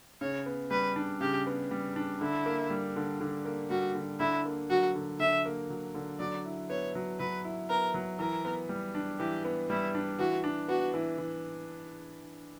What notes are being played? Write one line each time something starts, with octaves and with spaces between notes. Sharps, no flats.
C#3 C#5
B3
G3 B4
D4
C#3 G4
B3
G3
D4
D3 E4
A#3
G3
D3
D3
A#3
G3 F#4
D3
D3 E4
A#3
F#3 F#4
D3
D3 E5
A#3
F#3
D3
F#3 D5
E4
B3 C#5
F#3
F#3 B4
E4
B3 A#4
F#3
E3 A#4
B3
G3
D4
E3 G4
B3
G3 E4
D4
E3 F#4
D4
B3 F#4
E3
E3